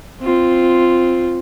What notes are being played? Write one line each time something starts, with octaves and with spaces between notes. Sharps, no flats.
C4 F4